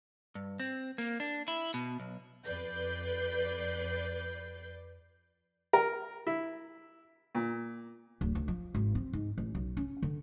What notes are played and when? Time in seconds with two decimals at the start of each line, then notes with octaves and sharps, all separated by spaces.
0.35 G2
0.60 C4
0.98 A#3
1.20 D4
1.48 E4
1.74 B2
2.00 B1
2.44 F2 B4 D5 G6 C7
5.73 A#4
6.27 E4
7.35 A#2
8.21 D1
8.35 D2
8.48 F3
8.74 G#1
8.95 C4
9.13 G#2
9.38 A1
9.55 B1
9.77 C#4
10.02 D3